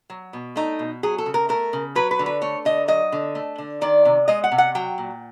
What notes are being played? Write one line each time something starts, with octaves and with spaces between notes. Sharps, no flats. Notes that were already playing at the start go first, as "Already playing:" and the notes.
F#3
B2
A3 D#4
B2
F#3 G#4
A4
C#3
A#4
A3 A#4
C#3
F#3 B4
B4
D3
B4
A3 C#5
D3 D#5
F#3 D#5
D3
A3
D3
D#3 D5
C3
G#3 D#5
F#5
C3
F#5
F#3 G5
A#2